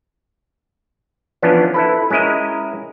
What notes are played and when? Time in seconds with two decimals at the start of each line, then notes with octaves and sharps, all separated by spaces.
1.42 E3 F3 B3 C#4 D4 E4
1.74 E4 A4 B4
2.10 G#3 C#4 E4 A#4 D#5